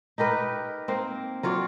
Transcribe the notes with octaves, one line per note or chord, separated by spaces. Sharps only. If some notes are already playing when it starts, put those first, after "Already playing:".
D#4 G4 A#4 B4
A#3 C4
F#3 F4 C#5 D5